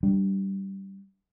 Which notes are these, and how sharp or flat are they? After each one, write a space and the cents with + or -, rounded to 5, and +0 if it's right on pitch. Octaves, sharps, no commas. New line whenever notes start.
G3 -15 D4 +0